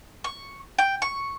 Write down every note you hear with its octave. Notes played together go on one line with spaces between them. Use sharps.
C#6
G5
C#6